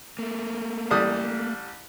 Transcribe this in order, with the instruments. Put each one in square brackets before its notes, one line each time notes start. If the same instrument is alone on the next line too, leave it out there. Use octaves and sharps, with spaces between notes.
[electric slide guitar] A3 A#3
[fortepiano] A1 G3 D#6